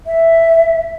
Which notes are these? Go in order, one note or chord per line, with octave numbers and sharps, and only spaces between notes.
E5